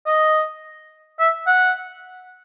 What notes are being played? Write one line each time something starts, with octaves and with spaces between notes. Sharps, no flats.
D#5
E5
F#5